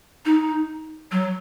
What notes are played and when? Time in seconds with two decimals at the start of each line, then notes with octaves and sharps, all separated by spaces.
0.25 D#4
1.12 F#3